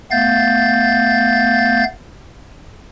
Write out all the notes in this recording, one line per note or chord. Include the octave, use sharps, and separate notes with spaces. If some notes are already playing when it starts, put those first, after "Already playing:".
A3 B3 F5 G6 A6